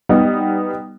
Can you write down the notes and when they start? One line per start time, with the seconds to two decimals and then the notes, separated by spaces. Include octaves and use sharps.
0.09 G3 B3 D#4